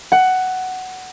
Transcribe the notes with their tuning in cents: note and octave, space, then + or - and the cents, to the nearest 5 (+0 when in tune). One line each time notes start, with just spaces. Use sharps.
F#5 +10